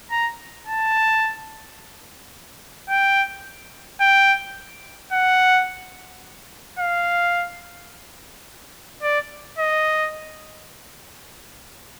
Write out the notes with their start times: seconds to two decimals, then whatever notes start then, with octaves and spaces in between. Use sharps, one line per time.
0.11 A#5
0.67 A5
2.90 G5
4.01 G5
5.13 F#5
6.79 F5
9.03 D5
9.58 D#5